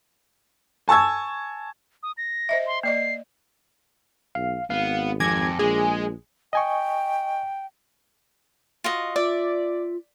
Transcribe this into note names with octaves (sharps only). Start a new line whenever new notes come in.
G#5 A5 C#6 E6 G#6
D#6
A#6
C5 D#5 E5
C6
A#3 D5 D#5 C7
B1 F5
G#1 B3 F5
F2 G#5 D6 G#6 A#6
A#1 G#3 G#4
D#5 G5 G#5 C#6
F4 F#4 D#5
F4 D5 E5